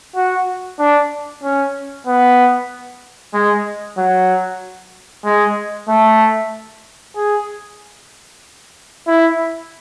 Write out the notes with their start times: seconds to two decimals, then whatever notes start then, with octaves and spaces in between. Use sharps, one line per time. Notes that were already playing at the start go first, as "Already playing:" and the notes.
0.16 F#4
0.79 D4
1.43 C#4
2.07 B3
3.34 G#3
3.98 F#3
5.25 G#3
5.88 A3
7.16 G#4
9.07 E4